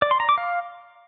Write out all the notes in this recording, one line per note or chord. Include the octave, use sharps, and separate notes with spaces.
D5
C6
A#5
D6
F5